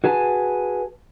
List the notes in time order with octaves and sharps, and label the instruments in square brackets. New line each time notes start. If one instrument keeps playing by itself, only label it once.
[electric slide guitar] F#4 G#4 B4 G#5 A5